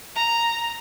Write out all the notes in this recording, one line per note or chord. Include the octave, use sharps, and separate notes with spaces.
A#5